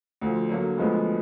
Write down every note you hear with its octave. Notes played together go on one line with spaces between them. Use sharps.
D2 D3 F3
D3 F#3 A#3
D2 D3 F3 G#3 B3